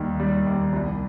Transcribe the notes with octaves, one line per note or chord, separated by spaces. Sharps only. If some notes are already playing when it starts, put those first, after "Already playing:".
Already playing: D#2 D#3 G3
G3
D#2
C2